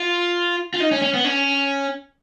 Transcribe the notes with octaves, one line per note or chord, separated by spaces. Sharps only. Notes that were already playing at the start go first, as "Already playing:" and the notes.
Already playing: F4
F4
D#4
C#4
C#4
B3
C#4